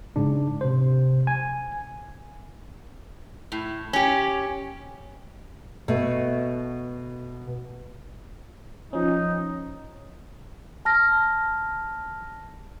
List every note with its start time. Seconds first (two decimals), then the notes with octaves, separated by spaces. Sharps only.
0.16 G#2 C#3 D4
0.61 C3 C5
1.27 G#5
3.52 A2
3.93 C#4 G4
5.88 B2 A3
8.93 F3 C#4 D#4
10.85 A5 F6 A#6